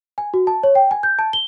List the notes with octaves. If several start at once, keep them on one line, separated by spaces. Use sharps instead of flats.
G#5
F#4
A5
C#5
G5
G#5
G6
A5
G7